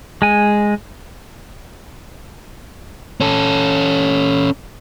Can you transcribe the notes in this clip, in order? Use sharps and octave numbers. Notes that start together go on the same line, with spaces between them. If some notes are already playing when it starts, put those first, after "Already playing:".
G#3 G#5
C#4 A4